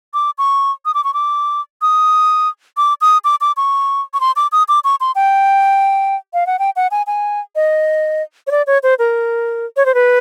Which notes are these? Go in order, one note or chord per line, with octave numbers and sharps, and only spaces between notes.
D6
C#6
D#6
D6
C#6
D6
D#6
D6
D#6
D6
D6
C#6
C#6
C6
D6
D#6
D6
C#6
C6
G5
F5
F#5
G5
F#5
G#5
G#5
D#5
C#5
D5
C#5
C5
A#4
C#5
C5
B4